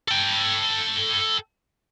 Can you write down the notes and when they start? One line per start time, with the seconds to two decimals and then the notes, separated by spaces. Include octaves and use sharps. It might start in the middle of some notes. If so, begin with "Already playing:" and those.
0.08 A4 G5